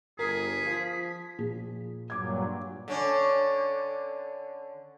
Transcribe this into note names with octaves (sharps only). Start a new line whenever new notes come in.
G1 G#4 A#4 B6
F3
A#2 F3 G#4
G2 A#2 F#3 D6 G#6
D3 C#4